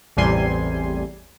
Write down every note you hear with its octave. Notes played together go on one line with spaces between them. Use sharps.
A1 E2 C3 G3 G#5 C6